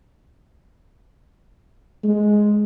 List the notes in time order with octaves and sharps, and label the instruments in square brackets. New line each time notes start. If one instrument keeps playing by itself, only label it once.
[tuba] G#3